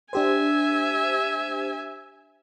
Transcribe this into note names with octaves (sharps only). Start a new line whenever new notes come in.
D4 G4 C5 E5 G#5